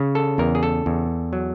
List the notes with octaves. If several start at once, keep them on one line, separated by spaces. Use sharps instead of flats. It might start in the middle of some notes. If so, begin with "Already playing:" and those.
Already playing: C#3
A4
E2 A#4
G#4
A4
E2
F#3